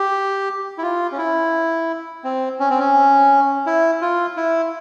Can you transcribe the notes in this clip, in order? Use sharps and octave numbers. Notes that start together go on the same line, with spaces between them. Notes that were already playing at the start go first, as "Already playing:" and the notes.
Already playing: G4
E4
F4
C#4
E4
C4
C#4
C4
C#4
E4
F4
E4